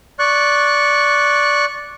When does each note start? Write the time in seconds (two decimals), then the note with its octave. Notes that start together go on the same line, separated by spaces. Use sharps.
0.19 D5 C#6 F#6